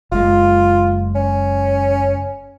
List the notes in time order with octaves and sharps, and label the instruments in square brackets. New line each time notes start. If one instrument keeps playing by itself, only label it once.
[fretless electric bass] F#1 G#3 [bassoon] F4
[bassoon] C#4